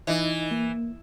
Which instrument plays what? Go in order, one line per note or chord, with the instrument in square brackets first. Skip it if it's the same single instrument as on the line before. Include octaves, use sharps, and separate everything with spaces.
[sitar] E3 [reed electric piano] D#4 D#5 E5
[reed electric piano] A#3